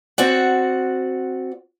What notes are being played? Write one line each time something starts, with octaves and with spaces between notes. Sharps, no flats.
C4 F#4 D5 F#5